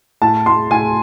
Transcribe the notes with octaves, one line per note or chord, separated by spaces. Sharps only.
A2 A5
A2 C6
A2 G#5